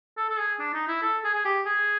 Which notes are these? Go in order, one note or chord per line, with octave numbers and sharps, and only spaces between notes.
A4
A4
G#4
D4
D#4
E4
A4
G#4
G#4
G4
G#4